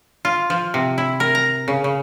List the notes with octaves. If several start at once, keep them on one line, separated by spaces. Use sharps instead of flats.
F4
F3
C3
E4
A#4
A#5
C#3
C#3